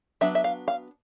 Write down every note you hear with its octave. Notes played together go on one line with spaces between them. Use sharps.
F#3 B3 D4 E5
E5
F5
F5